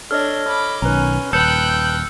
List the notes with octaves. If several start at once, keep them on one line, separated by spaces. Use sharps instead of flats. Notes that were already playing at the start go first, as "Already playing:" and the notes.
D4 A4 C#5 D#5 F6
B5 D6
B1 D#3 C#4 B4 A#5
D#1 B4 G5 A5 E6 F#6 G6 C#7